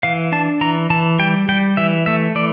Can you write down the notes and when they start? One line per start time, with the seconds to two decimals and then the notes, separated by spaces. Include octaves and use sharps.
0.03 E3 F5
0.32 D4 A5
0.61 E3 A#5
0.90 E3 A5
1.19 G3 G5
1.49 G3 G5
1.77 E3 E5
2.06 A3 E5
2.35 E3 D5